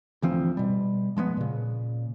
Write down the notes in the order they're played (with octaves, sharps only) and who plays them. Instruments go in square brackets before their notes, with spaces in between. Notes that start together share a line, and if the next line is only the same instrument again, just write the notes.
[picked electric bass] D2 E3 F3 C4
B2 G3
F3 G#3 A3 B3
A#2 C#3